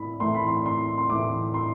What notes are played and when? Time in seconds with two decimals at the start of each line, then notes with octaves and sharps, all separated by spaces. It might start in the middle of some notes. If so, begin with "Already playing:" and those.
Already playing: A2 B5
0.20 A2 E3 A3 C6
0.34 B5
0.48 C6
0.66 C6
0.98 C6
1.10 A2 E3 A3 D6
1.54 C6